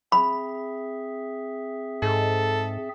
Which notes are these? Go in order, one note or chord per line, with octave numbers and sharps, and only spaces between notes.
C4 G#4 E5 B5
G#2 A4